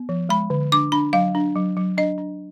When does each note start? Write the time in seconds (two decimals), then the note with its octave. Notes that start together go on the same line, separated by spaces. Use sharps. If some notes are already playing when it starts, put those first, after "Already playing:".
Already playing: B3
0.09 F3
0.29 G#3 B5
0.50 D3
0.72 D4 D6
0.92 D4 B5
1.13 F#3 F5
1.35 D4
1.56 F#3
1.77 F#3
1.97 D4 D#5
2.18 D4